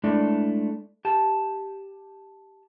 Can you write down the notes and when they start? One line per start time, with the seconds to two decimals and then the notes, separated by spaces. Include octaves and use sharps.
0.04 G#3 A3 D4 E4 D5
1.05 G4 A5